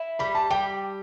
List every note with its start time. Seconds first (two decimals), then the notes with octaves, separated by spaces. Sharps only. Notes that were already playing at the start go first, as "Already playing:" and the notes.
Already playing: E4
0.19 G3 B5
0.35 A5
0.51 G3 G5